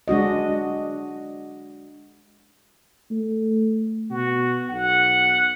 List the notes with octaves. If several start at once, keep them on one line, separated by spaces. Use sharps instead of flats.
G#3 D4 F#4 D#5
A3
B2 F#4
B1 F#5